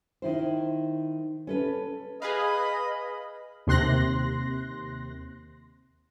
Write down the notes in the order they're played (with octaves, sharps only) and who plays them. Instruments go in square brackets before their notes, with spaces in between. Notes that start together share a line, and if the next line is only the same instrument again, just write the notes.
[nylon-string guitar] D#3 E4 C5
C#4 A4 B4
[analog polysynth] G#4 B4 F5 [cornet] D#5 [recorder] B5
[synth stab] D#2 C3 C6 F#6 A#6